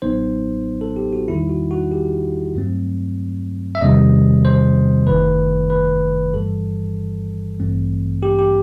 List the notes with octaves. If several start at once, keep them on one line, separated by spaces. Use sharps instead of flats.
A1 A2 F#3 B3 D#4 C5
A4
G4
F#4
E2 D#3 G3 D#4 E4
F#4
F#4
G4
G2 F#3 A3 C4
E5
E2 C3 D#3 G3 C4 D#5
C5
G1 F#2 D#3 A3 B4
B4
G2 E3 G3 A4
A1 G2 E3 A3 C4
G4
G4